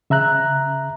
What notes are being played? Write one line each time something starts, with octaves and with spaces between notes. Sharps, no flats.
C#3 E5 A#5 F#6